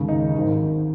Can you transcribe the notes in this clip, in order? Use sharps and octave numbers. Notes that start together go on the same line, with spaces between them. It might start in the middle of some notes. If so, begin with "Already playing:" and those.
Already playing: D#2 C#3 G#3
D#4
G#1 G#2 D#3